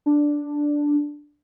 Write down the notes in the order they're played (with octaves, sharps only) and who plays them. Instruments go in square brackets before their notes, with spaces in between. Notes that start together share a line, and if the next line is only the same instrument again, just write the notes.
[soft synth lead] D4